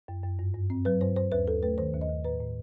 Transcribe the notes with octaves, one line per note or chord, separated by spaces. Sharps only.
F#2
F#2
G2
G2
C4
F#3 B4
G2 C5
G2 C5
D#2 B4
D#2 A4
A3 B4
D#3 C5
D#2
D#5
D#2
A2 B4
A2